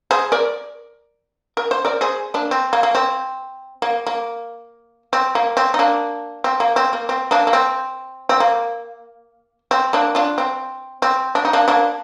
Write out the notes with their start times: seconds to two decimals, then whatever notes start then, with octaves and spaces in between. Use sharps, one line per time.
0.11 G#4 C5
0.32 A#4 D5
1.57 A#4
1.71 C5
1.85 A#4 D5
2.01 G#4 C5
2.34 A#3 D4
2.51 C4
2.73 A#3
2.83 A#3
2.95 C4
3.82 A#3
4.07 A#3
5.13 C4
5.35 A#3
5.57 C4
5.74 D#4
5.79 A#3 D4
6.44 C4
6.60 A#3
6.76 C4
6.93 A#3
7.09 C4
7.31 A#3 D4
7.47 A#3
7.53 C4
8.29 C4
8.40 A#3
9.71 C4
9.93 A#3 D4
10.15 D4 F4
10.38 C4
11.02 C4
11.35 D4
11.45 D#4
11.53 A#3 D4
11.68 A#3 D4